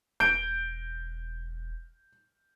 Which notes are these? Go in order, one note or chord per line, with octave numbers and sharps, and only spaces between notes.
E1 G6 D7